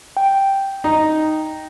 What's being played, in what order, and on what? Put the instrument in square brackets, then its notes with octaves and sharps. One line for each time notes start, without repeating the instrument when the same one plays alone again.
[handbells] G5
[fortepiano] D#4